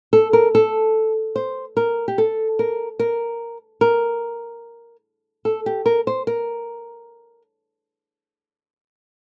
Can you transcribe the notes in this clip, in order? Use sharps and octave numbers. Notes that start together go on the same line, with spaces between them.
A4
A#4
A4
C5
A#4
G4
A4
A#4
A#4
A#4
A4
G4
A#4
C5
A#4